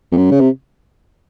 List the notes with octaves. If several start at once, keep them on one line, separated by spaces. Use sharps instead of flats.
F2
F#2
C#3
C3